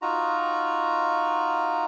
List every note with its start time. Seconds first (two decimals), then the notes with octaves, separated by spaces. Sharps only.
0.02 D#4 F4 F#4 A#5